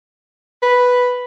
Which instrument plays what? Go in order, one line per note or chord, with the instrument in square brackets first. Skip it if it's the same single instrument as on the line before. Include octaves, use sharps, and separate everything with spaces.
[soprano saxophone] B4